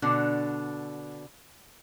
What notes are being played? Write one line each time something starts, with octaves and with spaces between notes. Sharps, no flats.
B2 D3 D4